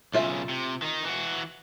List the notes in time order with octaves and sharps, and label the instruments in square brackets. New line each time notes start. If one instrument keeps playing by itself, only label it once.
[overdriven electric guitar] B1 C#3 [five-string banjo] A3 F4 E5
[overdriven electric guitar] C3
D#3 D#4
E3 F#4